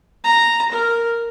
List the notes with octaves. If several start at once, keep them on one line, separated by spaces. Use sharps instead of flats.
A#5
A#4